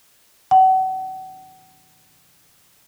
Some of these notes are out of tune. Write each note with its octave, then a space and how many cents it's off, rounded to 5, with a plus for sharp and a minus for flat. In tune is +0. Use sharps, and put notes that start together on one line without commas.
F#5 +35